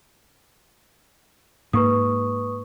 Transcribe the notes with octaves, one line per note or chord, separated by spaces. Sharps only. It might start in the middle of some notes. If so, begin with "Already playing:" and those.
G#2 A#3 B4 C#6 D#6